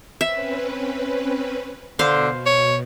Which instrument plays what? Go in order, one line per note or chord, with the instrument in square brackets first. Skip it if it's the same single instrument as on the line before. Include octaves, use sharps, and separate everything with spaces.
[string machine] C4 C#4 B4 [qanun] E5
[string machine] B2 [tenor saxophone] D3 [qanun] C5 F5 C6
[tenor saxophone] C#5